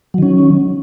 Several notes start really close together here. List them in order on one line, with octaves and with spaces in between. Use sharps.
F#3 D#3 C#4